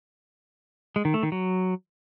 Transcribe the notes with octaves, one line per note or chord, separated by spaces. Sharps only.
G#3
D#3
A3
D#3
F#3